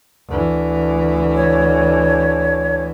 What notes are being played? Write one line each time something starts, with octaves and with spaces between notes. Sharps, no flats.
D2 E3
C#5